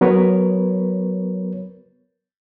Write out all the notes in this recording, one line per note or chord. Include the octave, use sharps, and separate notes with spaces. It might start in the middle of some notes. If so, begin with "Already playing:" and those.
F#3 B3 A#4 B4 C#5